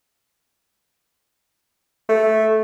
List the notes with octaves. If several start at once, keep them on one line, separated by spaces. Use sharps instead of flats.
A3